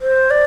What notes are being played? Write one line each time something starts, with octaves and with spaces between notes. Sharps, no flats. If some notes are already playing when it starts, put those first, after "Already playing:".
C5
D5